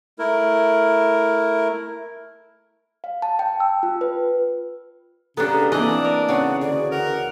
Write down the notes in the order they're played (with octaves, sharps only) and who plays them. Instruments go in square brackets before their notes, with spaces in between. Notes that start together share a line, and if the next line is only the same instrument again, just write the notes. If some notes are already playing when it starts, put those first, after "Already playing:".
[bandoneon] A3 E4 A#4
[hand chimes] F5
A5
G5
E6
F4
B4
[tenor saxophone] C#3 [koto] B3 D4 [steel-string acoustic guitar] G4 A4 [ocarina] A#5
[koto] E3 D#5 [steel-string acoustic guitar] A#3 C4 G#5 [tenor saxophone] D4 [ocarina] D5
[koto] A#4
[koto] C#3 [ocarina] F#5
[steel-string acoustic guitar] D2 G#4 [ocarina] D5
[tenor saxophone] A#4 [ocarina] F#5